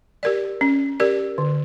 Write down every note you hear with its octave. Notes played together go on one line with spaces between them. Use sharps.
G4 A#4 D5
C#4
G4 A#4 D5
D3